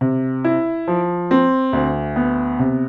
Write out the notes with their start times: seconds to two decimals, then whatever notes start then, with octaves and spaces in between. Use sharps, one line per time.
0.01 C3
0.44 E4
0.88 F3
1.31 C4
1.73 D2
2.16 B3
2.59 C3